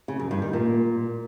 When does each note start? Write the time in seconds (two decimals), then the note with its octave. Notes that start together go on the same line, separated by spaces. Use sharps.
0.08 C#3
0.20 F#2
0.31 G2
0.42 D#3
0.53 A#2